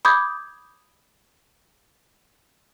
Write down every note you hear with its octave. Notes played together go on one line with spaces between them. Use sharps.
B5 D6 D#6 G6 G#6